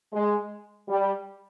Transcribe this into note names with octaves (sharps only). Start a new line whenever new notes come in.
G#3
G3